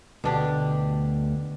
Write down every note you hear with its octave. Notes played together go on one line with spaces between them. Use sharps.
D2 B2 D4 G4